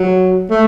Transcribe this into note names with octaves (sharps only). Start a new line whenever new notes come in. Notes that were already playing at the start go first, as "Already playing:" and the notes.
Already playing: F#3
A3